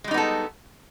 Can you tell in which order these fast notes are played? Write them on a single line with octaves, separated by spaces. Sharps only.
G#3 G3 D#4 B3 A4